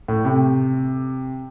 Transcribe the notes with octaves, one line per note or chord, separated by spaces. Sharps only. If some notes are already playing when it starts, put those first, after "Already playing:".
A2
C3